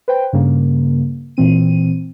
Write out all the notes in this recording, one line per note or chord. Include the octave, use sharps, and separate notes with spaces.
B4 C5 G5
G2 C#3 A#3
A#2 E3 C4 D#7